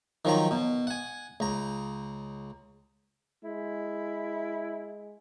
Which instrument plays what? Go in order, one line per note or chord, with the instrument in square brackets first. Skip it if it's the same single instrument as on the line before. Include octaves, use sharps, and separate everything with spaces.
[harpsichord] D#3 F3 F#3 A#5
B2
F#5 G#5
C#2 A#5
[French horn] G#3 [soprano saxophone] E4